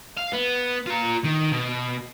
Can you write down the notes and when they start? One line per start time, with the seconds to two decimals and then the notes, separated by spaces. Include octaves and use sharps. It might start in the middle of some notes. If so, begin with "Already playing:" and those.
0.17 F5
0.33 B3
0.86 F4 A#5
1.24 D#3
1.53 B2